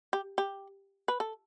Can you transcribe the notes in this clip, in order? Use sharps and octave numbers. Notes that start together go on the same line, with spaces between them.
G4
G4
B4
A4